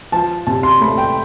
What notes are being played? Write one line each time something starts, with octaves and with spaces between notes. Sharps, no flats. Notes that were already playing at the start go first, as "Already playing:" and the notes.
F3 A5
C3 A5
C6
A3 B5
G5